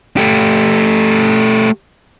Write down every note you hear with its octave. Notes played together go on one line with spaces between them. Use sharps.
A3 G4